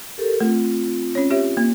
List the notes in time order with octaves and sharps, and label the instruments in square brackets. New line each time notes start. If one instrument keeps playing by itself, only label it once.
[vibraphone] G4 A4 A#4
[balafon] A3 [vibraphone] C4 F4
[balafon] C#4 C#5
G4 C#5 E5
A#3